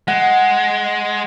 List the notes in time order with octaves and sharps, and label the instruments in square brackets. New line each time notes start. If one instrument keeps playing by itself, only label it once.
[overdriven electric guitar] G#3 [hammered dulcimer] F#5